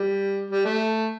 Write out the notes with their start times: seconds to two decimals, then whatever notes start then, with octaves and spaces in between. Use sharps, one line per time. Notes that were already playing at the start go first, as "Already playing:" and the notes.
Already playing: G3
0.50 G3
0.65 A3